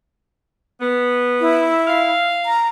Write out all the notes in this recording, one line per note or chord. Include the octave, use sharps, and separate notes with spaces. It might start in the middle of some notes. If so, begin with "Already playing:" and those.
B3
E4
F5
A#5